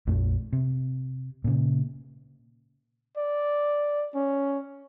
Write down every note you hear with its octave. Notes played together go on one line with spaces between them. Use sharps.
A#1 F2 A3
C3
A#2 C#3
D5
C#4